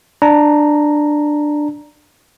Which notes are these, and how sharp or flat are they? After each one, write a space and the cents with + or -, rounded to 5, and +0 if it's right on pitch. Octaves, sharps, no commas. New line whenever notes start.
D4 +10 A#5 +0